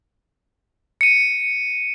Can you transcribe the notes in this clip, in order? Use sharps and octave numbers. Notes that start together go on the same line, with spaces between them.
C#7 D#7